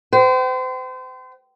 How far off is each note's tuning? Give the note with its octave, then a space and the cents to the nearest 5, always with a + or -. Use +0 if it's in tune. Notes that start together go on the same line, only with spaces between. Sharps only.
C5 -35 G5 -35